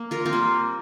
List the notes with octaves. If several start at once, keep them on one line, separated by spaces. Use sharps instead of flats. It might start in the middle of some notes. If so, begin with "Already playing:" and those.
Already playing: A#3
D3 F4 A#4
C4 F4
G3 A#3